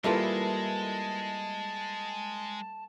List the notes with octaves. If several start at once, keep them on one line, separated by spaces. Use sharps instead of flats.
G3 G#3 A#3 E4 F4 A4 B4 A5